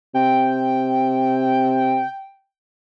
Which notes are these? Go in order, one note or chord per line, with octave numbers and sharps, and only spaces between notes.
C3 G5